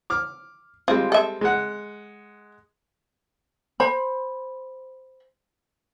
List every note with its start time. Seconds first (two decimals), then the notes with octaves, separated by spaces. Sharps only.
0.10 D6 F6
0.88 G3 G#3 C4 F4
1.12 A4 E5
1.41 G#3 F#5
3.80 C5 B5